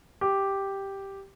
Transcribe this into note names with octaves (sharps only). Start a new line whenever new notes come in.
G4